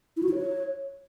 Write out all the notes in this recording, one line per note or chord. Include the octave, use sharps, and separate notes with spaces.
E4
F#4
E4
C#5